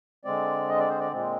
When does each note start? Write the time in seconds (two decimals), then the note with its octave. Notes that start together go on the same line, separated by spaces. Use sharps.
0.25 D3 G#3 C4 D5
0.69 D#5
0.79 D5
0.89 C5
0.99 D5
1.12 A#2 G#3 C4